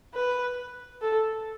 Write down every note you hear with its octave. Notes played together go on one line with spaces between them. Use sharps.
B4
A4